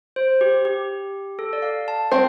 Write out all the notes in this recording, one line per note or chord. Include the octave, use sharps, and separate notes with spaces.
C5
G4
G4
A4
D5
F5
A5
C4 F4 C5 G5